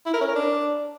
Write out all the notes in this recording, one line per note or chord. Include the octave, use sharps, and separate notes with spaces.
E4
A#4
C#4
A#4
D4